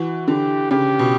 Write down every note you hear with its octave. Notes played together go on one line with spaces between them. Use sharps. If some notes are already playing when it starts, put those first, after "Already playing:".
Already playing: E3 F#4
D3 G4
C#3 G4
B2